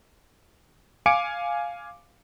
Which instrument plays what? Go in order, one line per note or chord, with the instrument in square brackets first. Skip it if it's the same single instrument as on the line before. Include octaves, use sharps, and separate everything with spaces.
[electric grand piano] F5 G#5 D6 C#7 D7